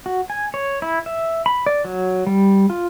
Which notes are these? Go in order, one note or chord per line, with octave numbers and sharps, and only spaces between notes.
F#4
G#5
C#5
E4
E5
B5
D5
F#3
G3
F4